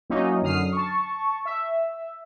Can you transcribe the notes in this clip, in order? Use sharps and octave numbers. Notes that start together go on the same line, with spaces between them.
F#3 A#3 C#4 D#4 E4
F#2 D3 D#6 F6 C7
A5 C#6
E5